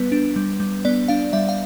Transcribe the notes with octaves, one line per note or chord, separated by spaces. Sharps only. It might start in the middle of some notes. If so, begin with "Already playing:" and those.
Already playing: G3 B3 B4
D4
G3
G3
B3 D5
D4 F5
G3 E5
F5